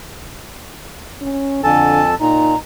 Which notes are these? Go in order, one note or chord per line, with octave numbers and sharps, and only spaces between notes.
C#4
F2 D3 A4 G#5 A5
A#2 D#4 A#5